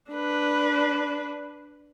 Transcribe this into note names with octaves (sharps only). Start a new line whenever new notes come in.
D4 B4